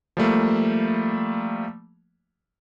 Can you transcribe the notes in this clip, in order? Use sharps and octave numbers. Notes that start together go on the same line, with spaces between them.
F3 G3 A3 A#3